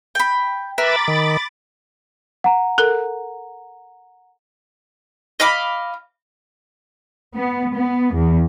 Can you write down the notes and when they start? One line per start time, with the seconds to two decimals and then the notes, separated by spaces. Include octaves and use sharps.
0.15 G5 B5
0.78 A#4 B4 E5 B5 D6 A6
1.08 D#3
2.44 F#5 A#5
2.78 A4 A#4
5.40 D#5 F5 B5 D6
7.37 B3
7.76 B3
8.14 E2